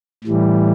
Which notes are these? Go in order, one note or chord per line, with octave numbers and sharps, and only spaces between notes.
A2 E3 G3